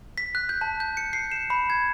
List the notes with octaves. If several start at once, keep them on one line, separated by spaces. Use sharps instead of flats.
B6
F#6
G6
A5
G6
C#7
C7
E7
B5
G#6